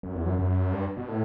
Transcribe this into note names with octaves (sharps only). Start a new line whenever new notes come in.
F#2
E2
F#2
F#2
G2
B2
A2